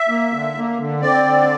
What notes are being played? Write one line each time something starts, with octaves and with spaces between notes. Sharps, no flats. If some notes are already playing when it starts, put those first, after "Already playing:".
Already playing: E5
A#3
D3
A#3
D3
C4 D5
D3